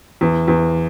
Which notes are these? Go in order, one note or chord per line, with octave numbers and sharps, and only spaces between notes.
E2
E2